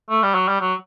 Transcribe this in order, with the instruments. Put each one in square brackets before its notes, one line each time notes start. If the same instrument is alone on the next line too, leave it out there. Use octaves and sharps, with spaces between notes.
[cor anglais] A3
G3
F#3
G3
F#3